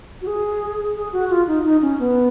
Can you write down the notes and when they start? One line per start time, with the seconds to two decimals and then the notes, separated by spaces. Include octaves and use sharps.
0.22 F#4
0.27 G#4
0.96 G#4
1.13 F#4
1.29 F4
1.47 D#4
1.65 D#4
1.82 C#4
1.99 B3